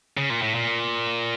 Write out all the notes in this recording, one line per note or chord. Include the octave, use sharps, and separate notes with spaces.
C#3
A#2
A2
A#2